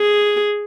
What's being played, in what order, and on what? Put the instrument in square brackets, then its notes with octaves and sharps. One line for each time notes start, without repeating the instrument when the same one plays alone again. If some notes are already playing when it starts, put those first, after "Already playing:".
Already playing: [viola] G#4